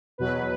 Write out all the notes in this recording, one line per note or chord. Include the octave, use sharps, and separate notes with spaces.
E2 B2 F#3 B4